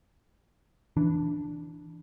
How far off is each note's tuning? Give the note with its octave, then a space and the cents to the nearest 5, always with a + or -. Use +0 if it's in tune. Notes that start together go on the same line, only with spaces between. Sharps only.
E3 +0 D4 +0